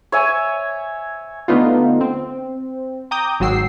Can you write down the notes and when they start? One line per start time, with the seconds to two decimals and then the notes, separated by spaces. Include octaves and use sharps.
0.12 C#5 E5 G#5
1.48 D3 A3 B3 D#4 F4
2.01 C4
3.11 G5 A#5 D6 D#6 G6
3.40 G#1 F#3 F#4 G5 E6 C7